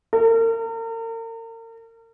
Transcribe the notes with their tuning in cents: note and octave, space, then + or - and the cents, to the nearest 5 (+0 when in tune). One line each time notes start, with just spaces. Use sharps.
A#4 -40